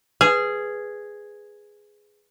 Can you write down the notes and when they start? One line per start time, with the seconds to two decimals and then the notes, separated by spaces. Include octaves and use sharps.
0.21 G#4 B4